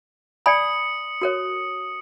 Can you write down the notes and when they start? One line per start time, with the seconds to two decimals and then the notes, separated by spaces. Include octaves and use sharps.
0.46 D5 G#5 B5 D#6 C#7
1.22 F#4 A#4 C#5